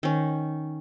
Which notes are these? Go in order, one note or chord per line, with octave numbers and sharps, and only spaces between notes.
D#3 C#4